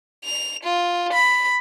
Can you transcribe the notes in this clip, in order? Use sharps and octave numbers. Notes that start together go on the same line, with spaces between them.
F7
F4
B5